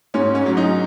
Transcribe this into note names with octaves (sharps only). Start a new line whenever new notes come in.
G#2 C#4
C#4
F#3
D#4